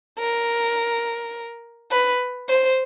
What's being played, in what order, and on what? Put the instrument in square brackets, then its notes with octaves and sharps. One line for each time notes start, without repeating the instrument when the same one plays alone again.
[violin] A#4
B4
C5